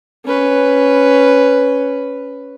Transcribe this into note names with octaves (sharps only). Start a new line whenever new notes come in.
C#4 B4